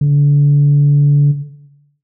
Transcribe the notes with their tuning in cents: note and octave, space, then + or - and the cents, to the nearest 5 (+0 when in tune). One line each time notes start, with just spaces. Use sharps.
D3 -30